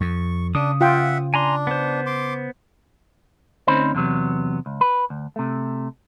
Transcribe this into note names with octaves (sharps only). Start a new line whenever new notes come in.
F2 C#6
C#3 D4 D#6
F4 E5 F#5 G5
D4 G#5 A#5 C6
B3 C5
C6 D6
D2 C4 C#4 D#4 C5 B5
E2 C3 F#3 B3
C#2
B4
D2
C3 A3